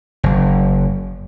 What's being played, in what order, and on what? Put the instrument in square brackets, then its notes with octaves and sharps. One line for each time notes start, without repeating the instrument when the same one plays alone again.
[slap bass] F#1